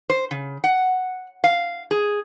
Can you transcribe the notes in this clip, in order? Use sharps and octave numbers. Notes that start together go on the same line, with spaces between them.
C5
C#3
F#5
F5
G#4